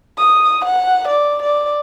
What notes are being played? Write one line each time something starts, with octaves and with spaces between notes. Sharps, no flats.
D#6
F#5
D5
D5